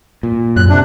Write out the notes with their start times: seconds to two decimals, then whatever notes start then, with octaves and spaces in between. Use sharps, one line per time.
0.23 A#2
0.56 F#2 F#6
0.69 C3 D4